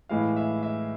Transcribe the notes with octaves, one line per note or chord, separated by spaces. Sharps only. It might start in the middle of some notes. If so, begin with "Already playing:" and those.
A2 E3 G#3 F5
E5
E5